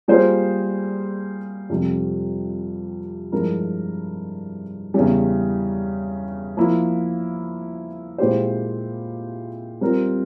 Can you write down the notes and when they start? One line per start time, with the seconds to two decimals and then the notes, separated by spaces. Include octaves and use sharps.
0.08 G3 A#3 F4 G#4 C5
1.70 F2 C3 G3
3.32 G2 F3 G#3 E4 A#4
4.94 E2 C#3 G3
6.57 F3 A#3 E4
8.18 A#2 G#3 E4 G4 C5
9.81 G3 C4 F4 A#4